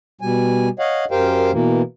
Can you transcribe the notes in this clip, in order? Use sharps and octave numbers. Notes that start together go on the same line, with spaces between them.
B2 G3 G#5
C#5 D#5 F5 F#5
F#2 G4 A#4 C5 F5 G5
B2 E3 A#3